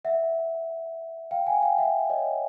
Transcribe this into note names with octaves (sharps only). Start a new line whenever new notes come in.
E5 F#5
F5 G5
F#5 G#5
F5 G5
E5 F#5
C#5 D#5